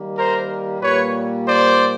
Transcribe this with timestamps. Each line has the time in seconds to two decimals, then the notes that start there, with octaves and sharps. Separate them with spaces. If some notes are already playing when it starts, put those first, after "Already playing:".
Already playing: D#3 G3 A#3
0.16 A#4 C5
0.81 A#2 G3 A#3 B4 C#5
1.46 C5 D5